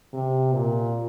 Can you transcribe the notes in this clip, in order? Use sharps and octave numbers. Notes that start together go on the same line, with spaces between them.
C3
A#2